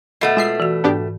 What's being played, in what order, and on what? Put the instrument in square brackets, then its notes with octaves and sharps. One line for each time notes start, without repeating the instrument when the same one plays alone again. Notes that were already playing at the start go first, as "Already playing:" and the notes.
[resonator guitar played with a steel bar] B2 A3 [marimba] D#5 F#5
[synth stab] G#3 E5 C7 [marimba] F4
[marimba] E3 F#4
[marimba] G#2 [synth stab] B3 D4 G4